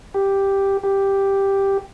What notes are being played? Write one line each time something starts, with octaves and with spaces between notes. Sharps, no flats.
G4
G4